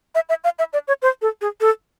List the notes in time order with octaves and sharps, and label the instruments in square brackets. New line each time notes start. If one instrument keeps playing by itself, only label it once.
[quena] E5
E5
F5
E5
D5
C#5
C5
A4
G#4
A4